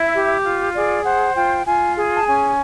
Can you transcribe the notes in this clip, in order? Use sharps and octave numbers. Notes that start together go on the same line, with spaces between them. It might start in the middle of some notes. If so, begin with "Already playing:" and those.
Already playing: E4 E5
G4
F4
G#4 D5
C5 F#5
F4 G5
F4 G#5
G#4
A5
C#4 G#5